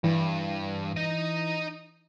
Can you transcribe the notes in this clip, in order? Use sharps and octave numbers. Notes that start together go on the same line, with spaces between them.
G2 E3
D#4 D#5